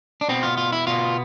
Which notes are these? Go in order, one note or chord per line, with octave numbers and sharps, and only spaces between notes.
D4
B2 B3 C4
F4
F4
E4
B2 B3 F4